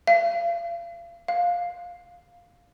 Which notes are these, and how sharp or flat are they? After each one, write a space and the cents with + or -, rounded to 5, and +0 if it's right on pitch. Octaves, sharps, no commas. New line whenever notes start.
F5 -35
F5 +10